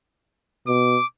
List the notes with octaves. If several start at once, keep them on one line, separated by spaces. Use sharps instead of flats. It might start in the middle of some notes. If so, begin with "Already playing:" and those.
B2 D6